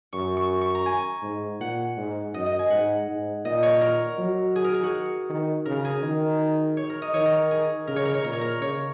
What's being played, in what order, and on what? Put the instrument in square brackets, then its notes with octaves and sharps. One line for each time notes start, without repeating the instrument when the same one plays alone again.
[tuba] F#2 [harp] C#6
[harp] C#6
C#6
A#5
G#5
[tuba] G#2
[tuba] A#2 [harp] F#5
[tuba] G#2
[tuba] F#2 [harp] D#5
[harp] D#5
G#5
[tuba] G#2 [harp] F#5
[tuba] G#2
[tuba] A#2 [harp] D#5
[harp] C#5
A#4
[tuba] F#3
[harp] G#4
A#4
G#4
F#4
[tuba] D#3
[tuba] C#3 [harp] A#4
[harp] G#4
[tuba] D#3
[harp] C#5
A#4
D#5
[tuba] D#3 [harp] C#5
[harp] A#4
G#4
[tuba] C#3 [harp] A#4
[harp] C#5
A#4
C#5
[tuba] A#2 [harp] A#4
[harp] C#5
A#4
[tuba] C#3 [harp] C#5